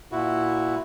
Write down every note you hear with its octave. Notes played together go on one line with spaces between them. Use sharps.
A#2 E4 F#4